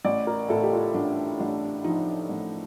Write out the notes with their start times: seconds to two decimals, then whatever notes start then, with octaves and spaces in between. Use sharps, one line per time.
0.05 A1 D5
0.27 A#4
0.49 A2 A4
0.63 G4
0.72 F4
0.94 A1 D4
1.39 A1 D4
1.84 F3 D#4
2.29 A1